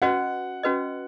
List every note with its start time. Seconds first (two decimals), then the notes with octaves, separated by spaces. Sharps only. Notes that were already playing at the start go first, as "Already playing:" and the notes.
0.02 C#4 F#4 B4 D#5 F#5
0.63 C#4 F#4 B4 D#5